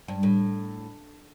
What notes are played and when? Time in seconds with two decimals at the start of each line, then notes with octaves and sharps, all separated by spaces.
0.08 G2
0.23 A2